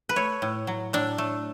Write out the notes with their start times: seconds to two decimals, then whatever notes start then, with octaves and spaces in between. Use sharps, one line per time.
0.09 B4
0.16 A3 C#5
0.42 A2
0.67 F#3
0.93 A2 D4
1.18 A3